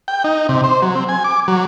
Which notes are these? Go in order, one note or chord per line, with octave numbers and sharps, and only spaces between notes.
G5
D#4
C3
C5
F#3
C4
G#5
D6
F#3